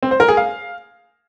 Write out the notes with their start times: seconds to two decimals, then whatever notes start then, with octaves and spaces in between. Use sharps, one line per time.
0.03 C4
0.11 C5
0.20 A#4
0.29 G#4
0.37 F5